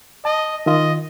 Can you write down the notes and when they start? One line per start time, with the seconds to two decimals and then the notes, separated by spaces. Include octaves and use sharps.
0.25 D#5 A5
0.66 D#3 F4 D#5